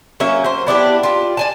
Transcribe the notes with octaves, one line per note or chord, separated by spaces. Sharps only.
F#3 A#3 C#4 E5
F#3 C5
B3 D4 E4 G4
F4 G4
D5 G#5 A5